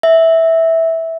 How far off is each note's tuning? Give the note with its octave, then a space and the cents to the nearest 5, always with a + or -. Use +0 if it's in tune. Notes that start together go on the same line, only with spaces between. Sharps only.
E5 -10